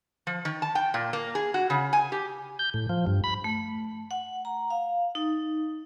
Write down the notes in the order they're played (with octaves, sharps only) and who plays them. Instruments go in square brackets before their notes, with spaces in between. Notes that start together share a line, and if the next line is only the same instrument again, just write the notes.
[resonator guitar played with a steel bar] F3
D#3
A5
G5
A#2
A#3
G#4
F#4
C#3
G#5
G4
[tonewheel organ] G6
A2
F3
G2
B5
[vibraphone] A3
F#5
A#5
F5
D#4